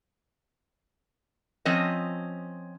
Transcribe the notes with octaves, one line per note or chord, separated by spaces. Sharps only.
F3 C4 C#4 D#5